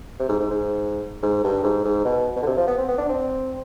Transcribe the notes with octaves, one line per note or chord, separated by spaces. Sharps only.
C3
G#2
G#2
G#2
G#2
G2
G#2
G#2
B2
B2
D3
C3
F3
B3
C4
B3
D4
C4